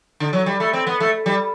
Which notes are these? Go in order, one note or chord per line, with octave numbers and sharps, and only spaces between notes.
D3
F#3
G3
A3
C4
B3
A3
G3